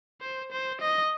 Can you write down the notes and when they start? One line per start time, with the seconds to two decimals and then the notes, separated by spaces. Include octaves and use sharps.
0.21 C5
0.52 C5
0.81 D#5